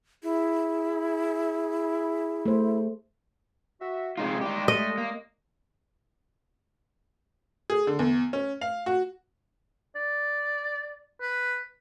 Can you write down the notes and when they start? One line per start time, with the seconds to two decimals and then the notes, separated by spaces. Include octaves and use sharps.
0.23 E4 G#4
2.45 A3 C5
3.81 F#4 E5
4.17 C3 G#3 D#4 F4
4.41 G3 G#3 D#4 G4
4.68 A3 D#5
4.98 A#3
7.70 G#4
7.87 D3
7.99 E2
8.33 C#4
8.61 F5
8.86 F#4
9.96 D5
11.22 B4